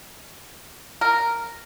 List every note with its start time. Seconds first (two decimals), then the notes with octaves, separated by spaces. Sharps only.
1.01 A#4